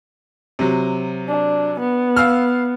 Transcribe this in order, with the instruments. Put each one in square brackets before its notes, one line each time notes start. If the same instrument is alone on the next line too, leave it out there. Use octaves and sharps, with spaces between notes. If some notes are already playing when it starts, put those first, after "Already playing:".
[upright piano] C3 F#3
[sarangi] D4
B3
[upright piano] F5 E6 F6